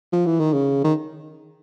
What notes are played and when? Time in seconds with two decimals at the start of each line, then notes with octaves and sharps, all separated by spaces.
0.13 F3
0.26 E3
0.40 D#3
0.53 C#3
0.84 D#3